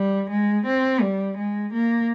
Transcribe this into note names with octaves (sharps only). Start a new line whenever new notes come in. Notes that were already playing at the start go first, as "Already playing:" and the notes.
Already playing: G3
G#3
C4
G3
G#3
A#3